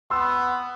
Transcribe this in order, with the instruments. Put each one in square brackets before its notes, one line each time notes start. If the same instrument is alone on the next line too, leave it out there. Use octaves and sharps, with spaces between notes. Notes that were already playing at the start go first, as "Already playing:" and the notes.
[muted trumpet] B3 [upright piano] C6 E6